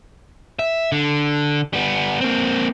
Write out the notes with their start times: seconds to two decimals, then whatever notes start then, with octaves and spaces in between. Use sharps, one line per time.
0.59 E5
0.92 D3
1.73 G3 B3
2.21 A#3 C4